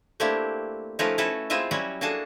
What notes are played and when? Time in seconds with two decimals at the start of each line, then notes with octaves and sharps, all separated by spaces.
0.20 A3 A#3 C4 D4 E4 G4
0.99 F3 A3 C#4 D#4 A#4 B4
1.18 C#4 E4 F#4 A4 B4
1.50 G#3 C4 E4 F4 D#5 E5
1.71 F#3 G3 C#4 E4 F#4
2.01 A#3 D4 F#4 G#4 A4 A5